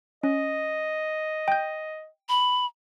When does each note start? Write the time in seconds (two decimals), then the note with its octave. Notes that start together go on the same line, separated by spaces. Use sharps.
0.23 C#4 D#5
1.48 G5 G6
2.29 B5